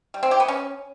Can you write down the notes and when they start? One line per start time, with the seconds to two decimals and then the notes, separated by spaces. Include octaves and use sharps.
0.14 G3
0.23 C4
0.31 G4
0.40 B3
0.48 C#4